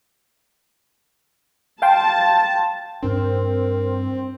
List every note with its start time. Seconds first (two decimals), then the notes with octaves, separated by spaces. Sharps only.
1.82 F5 G5 A5 C6
3.02 G2 C4 D4 A#4